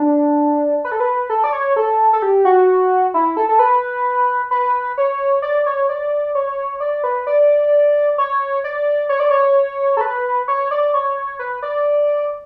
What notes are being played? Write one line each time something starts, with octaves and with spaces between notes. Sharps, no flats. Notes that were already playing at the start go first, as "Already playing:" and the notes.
Already playing: D4
B4
A4
B4
A4
D5
C#5
A4
A4
G4
F#4
E4
A4
A4
B4
B4
C#5
D5
C#5
D5
C#5
D5
B4
D5
C#5
D5
C#5
D5
C#5
A4
B4
C#5
D5
C#5
B4
D5